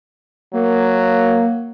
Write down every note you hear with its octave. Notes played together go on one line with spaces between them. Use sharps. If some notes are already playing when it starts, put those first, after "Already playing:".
F#3 A#3